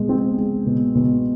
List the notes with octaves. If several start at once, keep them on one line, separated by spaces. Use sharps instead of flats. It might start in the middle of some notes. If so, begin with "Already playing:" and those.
Already playing: B2 G#3
C4
G#3
B2
B2